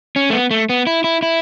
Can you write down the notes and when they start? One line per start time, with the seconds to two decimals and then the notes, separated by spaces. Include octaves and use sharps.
0.16 C#4
0.30 A3
0.33 B3
0.51 A3
0.69 B3
0.87 E4
1.04 E4
1.22 E4